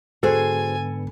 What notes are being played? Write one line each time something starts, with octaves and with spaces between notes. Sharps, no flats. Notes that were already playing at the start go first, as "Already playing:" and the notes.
G#2 D3 B3 F#4 G#4 A4 C5 G#5